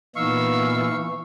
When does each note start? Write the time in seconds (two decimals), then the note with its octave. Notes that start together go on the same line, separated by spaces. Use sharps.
0.16 A#2 E3 B3 D#4 F5 C#6 E6